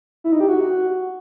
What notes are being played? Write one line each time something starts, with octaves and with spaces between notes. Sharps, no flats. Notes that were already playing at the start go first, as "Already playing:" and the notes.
E4
D#4
G4
F#4